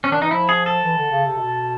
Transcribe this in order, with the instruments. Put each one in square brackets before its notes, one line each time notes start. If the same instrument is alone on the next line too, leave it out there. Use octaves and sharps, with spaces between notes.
[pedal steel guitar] C#4
[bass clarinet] D#3 [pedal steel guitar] D4
[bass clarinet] E3 [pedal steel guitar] D#4
[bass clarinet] F3 [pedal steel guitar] E4
[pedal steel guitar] G#4
A4
[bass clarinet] E3
D3
C#3
C3
B2